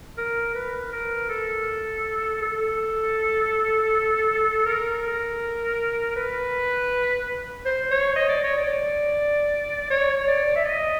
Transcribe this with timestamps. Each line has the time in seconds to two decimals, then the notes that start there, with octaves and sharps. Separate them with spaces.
0.18 A#4
0.55 B4
0.92 A#4
1.29 A4
2.42 A4
4.66 A#4
6.16 B4
7.66 C5
7.91 C#5
8.16 D#5
8.29 D5
8.44 C#5
8.58 D5
9.90 C#5
10.28 D5
10.56 E5
10.65 D#5